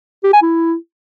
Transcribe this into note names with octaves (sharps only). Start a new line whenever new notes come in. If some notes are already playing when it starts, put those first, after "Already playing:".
G4
G#5
E4